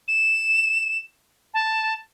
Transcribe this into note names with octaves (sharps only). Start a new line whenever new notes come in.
E7
A5